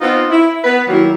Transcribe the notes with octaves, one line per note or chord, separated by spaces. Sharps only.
B3 C4 D#4 F4
E4
B3 B4
D#3 F#3 G3 A#3 E4